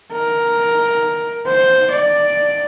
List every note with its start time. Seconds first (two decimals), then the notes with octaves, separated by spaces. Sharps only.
0.12 A#4
1.46 C5
1.91 D5